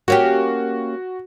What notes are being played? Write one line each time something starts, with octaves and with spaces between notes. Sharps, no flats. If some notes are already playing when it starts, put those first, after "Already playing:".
A#3 C#4 F#4 G4